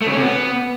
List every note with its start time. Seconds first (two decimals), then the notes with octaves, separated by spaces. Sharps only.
0.01 A3
0.07 C#3
0.12 C#4
0.17 C3
0.22 B3